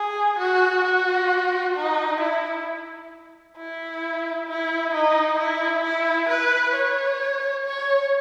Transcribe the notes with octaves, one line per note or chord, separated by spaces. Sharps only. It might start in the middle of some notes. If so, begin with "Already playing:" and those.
Already playing: G#4
F#4
F#4
D#4
E4
E4
E4
D#4
E4
E4
B4
C#5
C#5